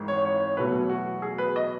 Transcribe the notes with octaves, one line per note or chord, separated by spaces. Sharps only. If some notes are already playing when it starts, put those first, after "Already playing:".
Already playing: G#1 G#2 E3 G#3
C#5
C#5
E2 B2 F#3 A3 B4
F#4
G#4
B4
D#5